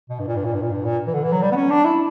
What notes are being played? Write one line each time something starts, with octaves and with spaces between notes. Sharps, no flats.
B2
G2
A#2
G2
A#2
G2
A#2
G2
A#2
E3
D3
E3
F#3
G3
B3
C#4
D4
E4